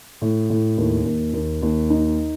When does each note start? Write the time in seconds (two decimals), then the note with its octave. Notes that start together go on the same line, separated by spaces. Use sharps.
0.22 A2
0.50 A2
0.77 D#2
1.05 D#2
1.33 D#2
1.62 D#2
1.90 D#4